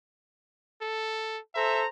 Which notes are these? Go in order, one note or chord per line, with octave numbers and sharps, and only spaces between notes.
A4
A4 C5 E5 A#5